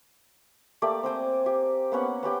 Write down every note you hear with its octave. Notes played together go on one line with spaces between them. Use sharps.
A3 A#3 G4 D5
C4 C5 G5 G#5
G4
A#3 B3 C#4 F#5
B3 C#4 G4 G5